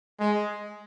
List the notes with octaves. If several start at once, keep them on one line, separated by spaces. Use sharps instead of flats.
G#3